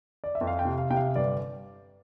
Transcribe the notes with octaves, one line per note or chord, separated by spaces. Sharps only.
D5
E5
F2
F5
G5
C3
F5
C3 G5
F5
G1 D5